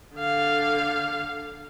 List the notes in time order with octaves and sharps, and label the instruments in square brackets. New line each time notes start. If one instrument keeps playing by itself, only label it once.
[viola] D3 F5